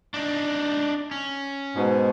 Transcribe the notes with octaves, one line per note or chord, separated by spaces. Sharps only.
D4 D#4
C#4
G#2 B2